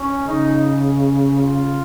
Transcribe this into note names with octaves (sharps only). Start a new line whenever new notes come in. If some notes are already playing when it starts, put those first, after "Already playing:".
Already playing: C#4
C#3 D#4
F4